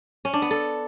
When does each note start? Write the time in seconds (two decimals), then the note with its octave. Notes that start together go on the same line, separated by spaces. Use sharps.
0.25 C#4
0.33 D4
0.42 B3
0.51 A4